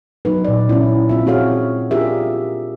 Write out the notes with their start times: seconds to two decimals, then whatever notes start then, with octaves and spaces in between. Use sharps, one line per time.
0.25 F#3 D#4 B4
0.45 A#2 D5
0.69 C#4 E4
1.09 C4 F4 E5
1.26 C4 F#4 G#4 C#5 F5
1.91 D4 F4 G4 G#4 A#4 E5